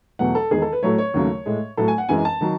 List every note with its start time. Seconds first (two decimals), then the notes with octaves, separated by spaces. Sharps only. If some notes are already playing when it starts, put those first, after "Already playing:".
0.19 E2 B2 F#3 A3 F#5
0.35 A4
0.51 E2 D#3 G#3 G#4
0.62 A4
0.72 B4
0.83 A2 F#3 A3 C#5
0.98 C#5
1.14 D#2 C#3 F#3 A3
1.46 A2 G#3
1.77 A2 F#3 A3 A4
1.88 G#5
1.98 F#5
2.09 F#2 E3 G#3 G#5
2.25 A5
2.41 D#3 F#3